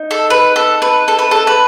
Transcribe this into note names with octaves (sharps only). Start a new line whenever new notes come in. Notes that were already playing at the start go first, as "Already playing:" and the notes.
Already playing: D#4
A4
B4
A4
B4
A4
B4
A4
B4